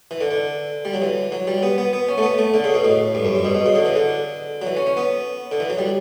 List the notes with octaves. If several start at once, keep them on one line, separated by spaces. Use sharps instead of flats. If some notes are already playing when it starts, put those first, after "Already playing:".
E3
D3
D3
G3
F#3
E3
F#3
G3
B3
B3
B3
C#4
A3
B3
A3
D3
C#3
B2
A2
G2
F#2
G2
B2
B2
C#3
D3
E3
D3
F#3
E3
C#4
C#4
B3
D3
E3
F#3
G3